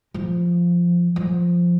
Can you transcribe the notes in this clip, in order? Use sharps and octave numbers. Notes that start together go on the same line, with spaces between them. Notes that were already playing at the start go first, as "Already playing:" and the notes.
F3
F3